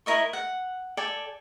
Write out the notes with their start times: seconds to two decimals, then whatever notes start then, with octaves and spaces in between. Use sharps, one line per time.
0.06 E4 A#4 D#5 C#6
0.33 F#5
0.97 A4 D5 G5 G#5